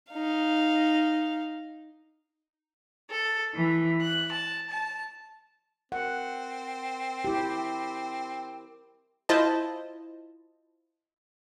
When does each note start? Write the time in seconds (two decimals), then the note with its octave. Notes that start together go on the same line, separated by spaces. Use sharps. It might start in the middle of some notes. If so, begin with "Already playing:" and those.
0.12 D#4 F5
3.12 A4
3.54 E3
4.02 F#6
4.34 A5
4.71 A5
5.92 C4 A#4 F#5
7.25 E4 G4
9.29 E4 F4 C5 D#5 A5